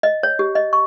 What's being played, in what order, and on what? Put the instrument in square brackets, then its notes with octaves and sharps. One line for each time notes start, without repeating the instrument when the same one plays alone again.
[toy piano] D#5
C#5
G4
D#5
C#6